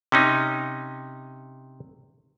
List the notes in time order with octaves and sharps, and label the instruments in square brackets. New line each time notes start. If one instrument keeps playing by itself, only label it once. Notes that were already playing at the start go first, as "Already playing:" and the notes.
[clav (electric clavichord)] C3 C#4 D#4